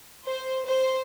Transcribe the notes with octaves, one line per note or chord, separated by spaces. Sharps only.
C5
C5